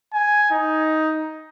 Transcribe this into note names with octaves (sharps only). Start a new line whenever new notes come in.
G#5
D#4